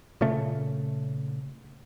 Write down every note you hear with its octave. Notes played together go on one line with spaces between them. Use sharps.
A#2 C#3 A3